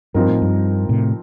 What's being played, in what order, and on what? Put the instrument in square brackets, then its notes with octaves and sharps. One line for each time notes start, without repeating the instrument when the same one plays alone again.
[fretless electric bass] G2 [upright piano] F3 C4 D#4 A#4
[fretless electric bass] A2
G2
A2 C3